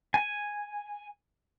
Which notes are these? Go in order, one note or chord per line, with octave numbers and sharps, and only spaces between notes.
G#5